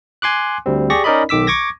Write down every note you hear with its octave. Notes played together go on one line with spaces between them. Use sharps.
G#5 C6 D6 F#6
D2 G3 C4
G4 G#4 D5 C#6 A#6
C#4 D#4 A#4 D5 D#5 B5
B1 D#3 D6 E6 B6
C#6 D6 G#6 A#6